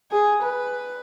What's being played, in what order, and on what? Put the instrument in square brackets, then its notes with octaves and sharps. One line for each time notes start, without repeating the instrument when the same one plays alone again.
[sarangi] G#4
B4